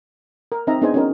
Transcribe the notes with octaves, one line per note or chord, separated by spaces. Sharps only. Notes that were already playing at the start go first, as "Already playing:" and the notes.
A#4
C4 D#4 D#5 E5 A#5
B3 D4 D#4 G#4 C5 G#5
C#4 D#4 F#4 A#4